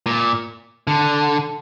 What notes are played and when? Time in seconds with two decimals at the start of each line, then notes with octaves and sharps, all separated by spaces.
0.06 A#2
0.87 D3